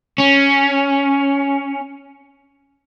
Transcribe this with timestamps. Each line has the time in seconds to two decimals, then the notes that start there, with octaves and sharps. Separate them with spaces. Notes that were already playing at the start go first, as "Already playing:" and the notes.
0.18 C#4